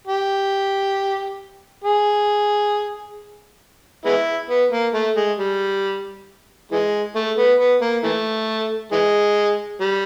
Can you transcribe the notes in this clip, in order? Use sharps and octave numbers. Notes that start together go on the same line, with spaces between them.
G4
G#4
G#3 B3 E4
B3
A#3
A3
G#3
G3
E3 G#3
A3
B3
B3
A#3
E3 A3
E3 G#3
G3